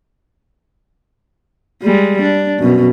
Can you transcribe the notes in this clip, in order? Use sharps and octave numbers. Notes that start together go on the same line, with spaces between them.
G3 G#3
D4
F#2 B2